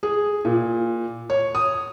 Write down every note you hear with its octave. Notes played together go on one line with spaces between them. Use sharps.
G#4
A#2
C#5
D#6